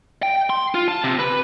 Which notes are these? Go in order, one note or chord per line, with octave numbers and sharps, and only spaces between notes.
G5
C6
F4
A5
C3
B4